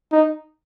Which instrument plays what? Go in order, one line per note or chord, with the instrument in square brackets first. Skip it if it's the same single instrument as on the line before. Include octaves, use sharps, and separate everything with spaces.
[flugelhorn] D#4